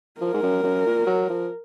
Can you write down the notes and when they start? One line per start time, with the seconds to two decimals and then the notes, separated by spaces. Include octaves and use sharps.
0.20 F3 A#4
0.34 G#2
0.43 F#2
0.63 F#2
0.86 A#2
1.07 F#3
1.30 F3